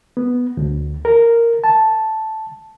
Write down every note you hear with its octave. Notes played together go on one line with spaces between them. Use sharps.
B3
D2
A#4
A5